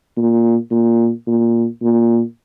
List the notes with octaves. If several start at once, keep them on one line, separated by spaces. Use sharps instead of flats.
A#2
A#2
A#2
A#2